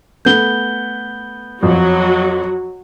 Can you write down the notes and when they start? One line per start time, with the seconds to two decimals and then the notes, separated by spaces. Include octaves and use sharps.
0.25 A3 B3 G6 G7
1.63 F2 F#3 F#4